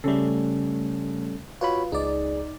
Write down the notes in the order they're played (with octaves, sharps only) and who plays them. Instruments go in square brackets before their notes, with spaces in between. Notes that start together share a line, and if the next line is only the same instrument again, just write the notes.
[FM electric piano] C#3 A3 [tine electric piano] G3 C#4 A4
[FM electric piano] F4 B4 [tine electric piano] F#4 C#5 B5
[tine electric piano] C#2 G#4 [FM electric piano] D#4 D5